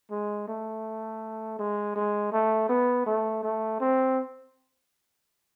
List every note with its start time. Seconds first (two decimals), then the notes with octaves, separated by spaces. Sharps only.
0.11 G#3
0.48 A3
1.59 G#3
1.96 G#3
2.32 A3
2.69 B3
3.06 A3
3.43 A3
3.80 C4